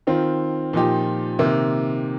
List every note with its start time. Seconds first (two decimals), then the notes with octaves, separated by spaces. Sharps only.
0.07 D#3 C4 F4
0.73 A#2 F3 D#4 G4
1.39 C3 D#3 A#3